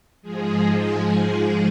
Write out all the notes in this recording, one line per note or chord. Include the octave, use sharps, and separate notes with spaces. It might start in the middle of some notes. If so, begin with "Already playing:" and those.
G#2 F3 G#3 G#4
G#3 G#4